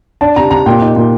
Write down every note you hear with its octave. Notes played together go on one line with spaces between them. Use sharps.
D4 A5
C3 A#5
C3 A#5
A#2 G5
D#4
A#2